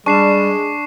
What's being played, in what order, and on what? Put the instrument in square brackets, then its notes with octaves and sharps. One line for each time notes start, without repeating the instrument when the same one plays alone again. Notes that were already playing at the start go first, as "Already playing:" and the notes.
[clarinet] G3 [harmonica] G#3 [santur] D4 [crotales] C#6 C7 E7